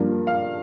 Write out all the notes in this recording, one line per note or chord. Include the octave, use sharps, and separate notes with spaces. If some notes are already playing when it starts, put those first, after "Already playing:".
Already playing: G2 F3 A#3 D4
F5